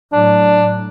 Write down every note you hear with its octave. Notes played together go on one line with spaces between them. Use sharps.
A2 F#3 D4